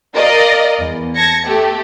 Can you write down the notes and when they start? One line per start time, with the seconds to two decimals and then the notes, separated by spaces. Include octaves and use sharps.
0.14 A#4 D5 D#5 F5
0.79 E2
1.15 A5 G#6 A#6 C#7
1.46 A3 G4 A4